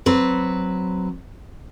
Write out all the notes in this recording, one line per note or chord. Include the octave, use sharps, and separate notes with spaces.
F#3 C4 B4